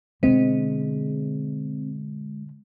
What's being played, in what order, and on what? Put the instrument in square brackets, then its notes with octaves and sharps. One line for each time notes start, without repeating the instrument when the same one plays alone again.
[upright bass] B2 D3 [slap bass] G#3 [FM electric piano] C4